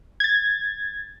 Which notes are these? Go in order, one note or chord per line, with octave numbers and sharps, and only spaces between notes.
G#6 A6